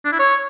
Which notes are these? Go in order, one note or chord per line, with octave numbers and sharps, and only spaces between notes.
D4
E4
C#5